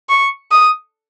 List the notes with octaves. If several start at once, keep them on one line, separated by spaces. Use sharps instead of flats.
C#6
D#6